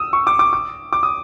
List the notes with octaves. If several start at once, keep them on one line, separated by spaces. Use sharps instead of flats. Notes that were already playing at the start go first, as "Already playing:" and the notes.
Already playing: D#6 E6
C#6
D6
D6
D6
D6
D#6